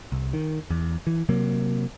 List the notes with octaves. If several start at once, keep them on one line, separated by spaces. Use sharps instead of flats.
C2
D#3
E2
E3
C3 F#3 A#3